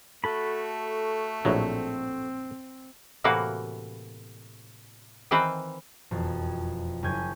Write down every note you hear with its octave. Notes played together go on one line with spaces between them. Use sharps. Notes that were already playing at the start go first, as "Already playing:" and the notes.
A3 F#4 A4 B5
A#1 A2 F#3 C4
A2 C3 E3 A#3 F#4 F5
D#3 E3 C4 B4 C5
E1 F2
F#1 C#4 G#5 G6 G#6